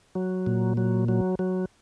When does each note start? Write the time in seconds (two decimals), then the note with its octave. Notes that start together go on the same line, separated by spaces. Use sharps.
0.15 F#3
0.47 A#2
0.77 F#3
1.08 F#3
1.39 F#3